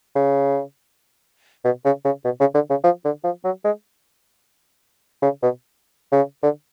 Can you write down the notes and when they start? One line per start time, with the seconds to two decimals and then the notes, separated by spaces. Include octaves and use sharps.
0.16 C#3
1.65 B2
1.85 C#3
2.05 C#3
2.25 B2
2.40 C#3
2.55 D3
2.70 C#3
2.84 F3
3.05 D3
3.24 F3
3.44 F#3
3.65 G#3
5.23 C#3
5.43 B2
6.12 C#3
6.43 D3